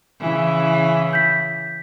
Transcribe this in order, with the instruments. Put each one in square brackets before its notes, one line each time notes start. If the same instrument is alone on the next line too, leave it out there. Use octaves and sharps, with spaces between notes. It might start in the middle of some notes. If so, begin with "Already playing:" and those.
[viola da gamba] C#3 E3
[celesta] G6 B6